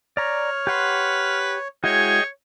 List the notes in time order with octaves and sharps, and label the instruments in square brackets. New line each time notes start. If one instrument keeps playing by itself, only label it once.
[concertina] C#5 [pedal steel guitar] D5 A#5 [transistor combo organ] F6
[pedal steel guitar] G4 F#5 C6 [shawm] B4
[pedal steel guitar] G#3 E4 F#4 [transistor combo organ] G#4 D#5 G5 [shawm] C#5